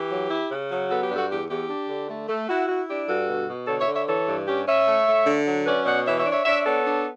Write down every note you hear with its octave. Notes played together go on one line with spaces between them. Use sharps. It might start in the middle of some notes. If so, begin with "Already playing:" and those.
Already playing: E3 G4
F#3
E4
C#3
F#3
B3 F#4 A4
G4
G2
F#4 A4
E2 G4
E2 G4
D4
D3
A3
A3
E4 F#4
E4 F#4
D4 G4
G2 F#4 A4
B2
B2
D3 A4 C#5
C#5 E5
D3
C#5 E5
E3 A4 C#5
G2
C#4 G4
C#4 C#5 E5
A3
A3
D3
F#3
C#4 B4 D5
B2 D5 F#5
E3 C#5 E5
C#5 E5
D4
C#5 E5
D4 C#5 E5
B3 A4 C#5
D4